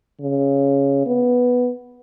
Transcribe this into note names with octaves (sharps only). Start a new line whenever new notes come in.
C#3
B3